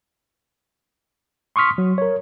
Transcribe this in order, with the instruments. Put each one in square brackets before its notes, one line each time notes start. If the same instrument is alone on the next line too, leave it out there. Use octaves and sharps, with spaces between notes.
[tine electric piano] C6 C#6 D#6 F6 B6
F#3
A#4 C#5